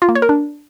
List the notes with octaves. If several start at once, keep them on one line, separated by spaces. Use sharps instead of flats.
F4
A#3
C#5
A#4
D4